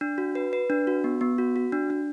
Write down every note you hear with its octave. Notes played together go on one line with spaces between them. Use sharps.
D4
F#4
B4
B4
D4
F#4
B3
B3
F#4
F#4
D4
D4